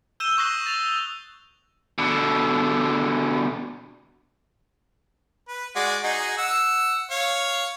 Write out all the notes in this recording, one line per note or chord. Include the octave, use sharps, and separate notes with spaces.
E6 G6 D#7 E7 G7
C#6 D#6 F#6 A#6 C7 D#7
A6 F7
B2 D3
B4
G#3 F#4 D5
D#4 F#4 G#4
F#5 E6
C#5 F5